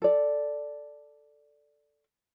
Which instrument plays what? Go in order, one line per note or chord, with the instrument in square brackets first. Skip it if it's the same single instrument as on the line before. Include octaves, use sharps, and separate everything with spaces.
[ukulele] A4 D5